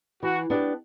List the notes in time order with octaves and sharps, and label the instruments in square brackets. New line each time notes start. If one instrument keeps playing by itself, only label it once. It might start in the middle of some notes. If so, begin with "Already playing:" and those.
[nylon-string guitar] E3 [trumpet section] F#4
[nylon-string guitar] B3 D4 G4